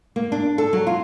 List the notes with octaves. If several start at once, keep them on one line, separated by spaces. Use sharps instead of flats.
A#3
D4
A4
F#3
F4